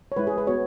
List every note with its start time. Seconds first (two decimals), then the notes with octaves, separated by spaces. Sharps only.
0.12 C#5
0.17 G#3 E4 B4
0.27 G#4
0.38 B4
0.47 B3 F#4 C#5